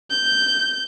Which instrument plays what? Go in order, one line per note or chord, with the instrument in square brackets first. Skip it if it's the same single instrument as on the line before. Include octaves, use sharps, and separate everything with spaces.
[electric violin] G6